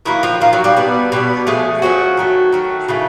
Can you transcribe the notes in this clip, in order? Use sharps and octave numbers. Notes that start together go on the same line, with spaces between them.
D#3 F#3 A#3 E4
F3 F4
D#3 F3 A#3 F4
F#3 F#4
G3 G4
B2 G3 B3 D4
B2 G3 B3 D4
F3 G#3 A3 C#4 G#4
F3 F#3 A3 C#4 F#4
D#3 F#3 A3
D#3 F#3 A3
C#3 E3 A3